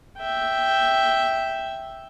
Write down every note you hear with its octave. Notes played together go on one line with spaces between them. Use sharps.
E5 G5